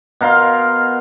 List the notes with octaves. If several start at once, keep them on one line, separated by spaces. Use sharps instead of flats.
B2 A#4 F5 C6